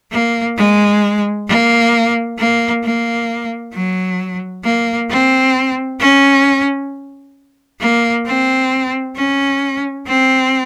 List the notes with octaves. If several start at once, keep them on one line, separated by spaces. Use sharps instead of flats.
A#3
G#3
A#3
A#3
A#3
F#3
A#3
C4
C#4
A#3
C4
C#4
C4